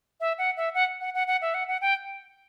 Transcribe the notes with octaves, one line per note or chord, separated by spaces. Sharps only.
E5
F#5
E5
F#5
F#5
F#5
F#5
E5
F#5
F#5
G5